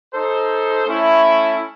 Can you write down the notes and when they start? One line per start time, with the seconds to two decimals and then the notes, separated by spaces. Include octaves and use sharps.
0.14 D#4 A4 C5
0.86 A3 C#4 E4